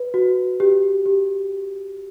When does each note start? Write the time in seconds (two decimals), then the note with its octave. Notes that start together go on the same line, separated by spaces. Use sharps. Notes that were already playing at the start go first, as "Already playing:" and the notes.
Already playing: B4
0.14 F#4
0.60 G4
1.06 G4